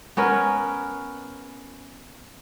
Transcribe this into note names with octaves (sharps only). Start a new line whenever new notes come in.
B3 C#4 A#4 B4